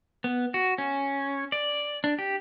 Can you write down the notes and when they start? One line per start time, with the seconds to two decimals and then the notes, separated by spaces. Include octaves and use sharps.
0.24 B3
0.54 F#4
0.78 C#4
1.52 D5
2.04 D4
2.19 G4